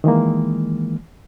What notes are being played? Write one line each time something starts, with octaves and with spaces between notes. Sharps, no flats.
D#3 E3 G#3 A#3